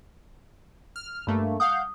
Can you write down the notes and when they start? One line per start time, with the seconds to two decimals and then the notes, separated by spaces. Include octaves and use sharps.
0.96 F6
1.27 G2 A3 A#3 B5
1.60 F5 F#5 D#6 G6